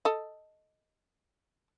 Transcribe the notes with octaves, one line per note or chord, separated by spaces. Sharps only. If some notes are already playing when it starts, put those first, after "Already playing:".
A4 D#5